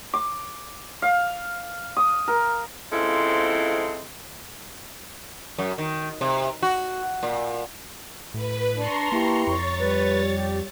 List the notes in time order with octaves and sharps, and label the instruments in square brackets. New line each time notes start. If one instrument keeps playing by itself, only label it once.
[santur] D6
F5
D#6
A#4
[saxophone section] C#3 F3 G#3 C4 E4 A4
[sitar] F#2
D#3
C3
F#4
A#2
[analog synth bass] A2 [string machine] B4
[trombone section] D4 [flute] A5 [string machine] A#5 C6 C#6
[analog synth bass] A#3 [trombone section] E4 G4 B4
[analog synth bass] F2 [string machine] C#5 A6 [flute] C#6
[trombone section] G3 [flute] B4
[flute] G4